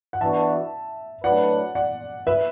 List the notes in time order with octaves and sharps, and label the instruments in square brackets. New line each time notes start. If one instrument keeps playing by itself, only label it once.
[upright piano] F#5
[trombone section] E3 B3 D4 F#4 [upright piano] E5 A5
[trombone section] A2 F#3 D4 B4 [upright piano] D5 F#5
[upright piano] D5 F#5
B4 E5